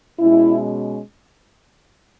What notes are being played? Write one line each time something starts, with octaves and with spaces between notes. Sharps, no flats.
B2 G#3 C#4 E4